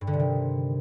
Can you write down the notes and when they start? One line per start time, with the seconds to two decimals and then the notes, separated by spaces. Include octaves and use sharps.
0.01 G2
0.07 D3
0.13 C3
0.20 D#3